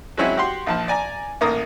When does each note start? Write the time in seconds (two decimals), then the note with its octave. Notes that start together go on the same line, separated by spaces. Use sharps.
0.17 F#3 G#3 C4 C#4 E4 F#4
0.37 F#4 G4 C6
0.67 A#1 F3 A5
0.88 D5 G#5 A#5
1.41 A1 A#3 A#4 D#6